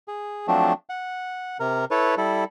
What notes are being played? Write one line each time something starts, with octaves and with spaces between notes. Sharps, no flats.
G#4
F3 F#3 A3 C4 D4
F#5
C3 A#4
E4 A4 B4 C#5
G3 E4 A4